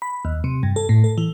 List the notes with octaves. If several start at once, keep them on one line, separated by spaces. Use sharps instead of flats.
B5
D#2
C3
G2
A4
A2
A4
E3